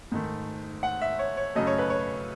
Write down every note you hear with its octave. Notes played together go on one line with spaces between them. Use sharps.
G#2 D#3 A3
F#5
E5
C#5
C#5
F#2 C#3 F#3 A3 D#5
C#5
B4
C#5